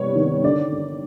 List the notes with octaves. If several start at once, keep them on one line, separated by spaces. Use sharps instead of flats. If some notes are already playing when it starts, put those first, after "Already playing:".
Already playing: C3 G3 B3 C#5
D#3
D3 D5
D3